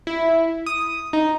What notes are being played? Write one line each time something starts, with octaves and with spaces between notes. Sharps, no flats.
E4
D#6
D#4